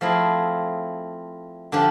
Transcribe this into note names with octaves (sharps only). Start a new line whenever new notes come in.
F3 A3 C4 E4 G#4
D3 F3 D4 G4